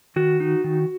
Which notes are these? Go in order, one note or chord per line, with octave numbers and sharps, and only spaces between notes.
D#3 F#4
D#4
D#3